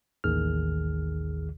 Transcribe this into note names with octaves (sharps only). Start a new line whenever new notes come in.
A1 D#2 D#3 G#4 F6